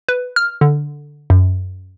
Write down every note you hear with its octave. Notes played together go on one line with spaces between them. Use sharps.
B4
F6
D3
F#2